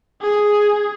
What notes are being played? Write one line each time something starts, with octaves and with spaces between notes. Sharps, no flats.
G#4